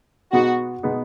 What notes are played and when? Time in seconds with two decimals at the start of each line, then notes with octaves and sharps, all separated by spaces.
0.32 B2 G#3 B3 D#4 F#4
0.83 B2 G#3 B3 D#4